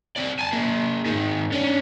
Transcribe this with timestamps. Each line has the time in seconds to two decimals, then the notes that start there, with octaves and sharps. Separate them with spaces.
0.16 C4 D5
0.39 G#5 A5
0.53 A#3 G#4
1.06 G#2 D#3
1.52 C#4 D4